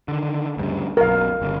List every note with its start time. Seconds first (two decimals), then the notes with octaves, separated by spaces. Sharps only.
0.08 D3 D#3
0.57 D2 G2 C#3
0.97 B1 F#2 A#4 F5
1.42 G1 C#3